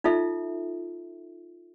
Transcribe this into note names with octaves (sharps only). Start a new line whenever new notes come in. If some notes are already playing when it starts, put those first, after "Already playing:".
D#4 F4 A4 E5